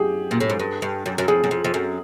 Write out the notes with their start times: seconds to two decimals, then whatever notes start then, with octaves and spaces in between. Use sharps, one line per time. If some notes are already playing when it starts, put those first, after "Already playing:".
Already playing: F#2 G4 G#4
0.31 A#2
0.40 A2
0.50 G#2
0.60 G2
0.82 G2
1.06 F#2
1.18 F#2
1.28 F2 G#4
1.44 F#2
1.51 F2
1.64 F2
1.74 F#2